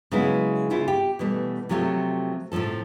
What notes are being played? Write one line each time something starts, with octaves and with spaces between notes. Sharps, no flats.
C#3 F#3 G#3 B3 E4
C#3 E4 F4
G4
B2 E3 G3 A3
C3 F3 F#3 A3 F4 G4
A2 C3 E3 F3 A4